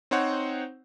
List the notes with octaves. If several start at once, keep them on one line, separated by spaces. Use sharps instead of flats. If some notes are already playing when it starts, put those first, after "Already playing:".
C4 D#4 C5 C#5 F#5